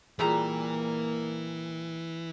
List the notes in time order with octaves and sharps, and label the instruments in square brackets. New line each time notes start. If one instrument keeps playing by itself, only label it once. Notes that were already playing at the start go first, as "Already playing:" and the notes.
[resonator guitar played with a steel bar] A#2 G3 A#5 [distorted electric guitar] E3 [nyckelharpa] A#3 [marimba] F4 G#4